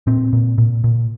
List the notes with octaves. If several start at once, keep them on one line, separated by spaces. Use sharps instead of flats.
A#2 C4
A#2
A#2
A#2